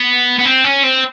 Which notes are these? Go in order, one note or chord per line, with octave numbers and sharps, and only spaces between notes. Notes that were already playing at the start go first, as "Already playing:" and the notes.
Already playing: B3
B3
C4
C#4
C4